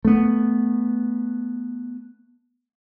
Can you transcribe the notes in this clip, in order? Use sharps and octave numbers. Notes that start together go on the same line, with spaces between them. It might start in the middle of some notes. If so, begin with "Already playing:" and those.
A3 B3